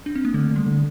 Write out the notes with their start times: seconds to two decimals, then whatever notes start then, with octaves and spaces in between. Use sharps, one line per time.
0.06 D4
0.15 C4
0.25 A#3
0.34 D3 A3
0.51 D3
0.56 G3
0.66 D3